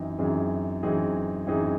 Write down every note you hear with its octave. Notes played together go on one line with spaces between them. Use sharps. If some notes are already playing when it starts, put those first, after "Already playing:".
Already playing: F#2 E3 C4 D#4
F#2 E3 C4 D#4 G#4
F#2 E3 C4 D#4 G#4
F#2 E3 C4 D#4 G#4